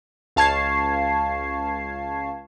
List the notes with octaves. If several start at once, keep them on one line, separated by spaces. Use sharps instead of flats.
C#2 F5 A5 C#6 G#6 C7